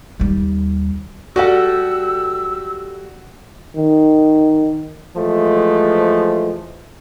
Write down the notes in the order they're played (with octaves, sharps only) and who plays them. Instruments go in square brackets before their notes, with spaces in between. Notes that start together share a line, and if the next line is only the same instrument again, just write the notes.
[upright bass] D#2 G3
[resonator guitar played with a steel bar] G3 G4 A4 [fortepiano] F#4 F#5 [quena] E6
[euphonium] D#3
[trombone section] E3 F3 G#3 A3